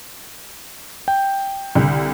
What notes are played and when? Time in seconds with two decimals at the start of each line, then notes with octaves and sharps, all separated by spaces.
1.08 G5
1.75 C2 D3